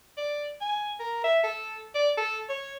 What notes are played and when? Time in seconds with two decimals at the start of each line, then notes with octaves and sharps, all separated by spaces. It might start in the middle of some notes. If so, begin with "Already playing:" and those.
0.17 D5
0.61 G#5
1.00 A#4
1.24 E5
1.43 A4
1.95 D5
2.17 A4
2.49 C#5